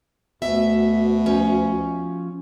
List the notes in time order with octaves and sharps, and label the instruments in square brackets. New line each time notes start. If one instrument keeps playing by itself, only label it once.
[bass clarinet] D2 [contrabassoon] B2 [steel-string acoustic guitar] E5
[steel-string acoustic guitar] F3 C#4